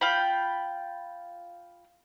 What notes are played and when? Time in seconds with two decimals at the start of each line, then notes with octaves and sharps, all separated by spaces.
0.01 F4 G5 B5